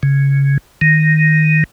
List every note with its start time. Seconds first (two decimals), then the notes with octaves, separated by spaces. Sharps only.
0.03 C#3
0.81 D#3